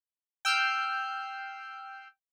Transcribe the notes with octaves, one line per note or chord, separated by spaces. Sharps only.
G5 E6 F6 G6 C7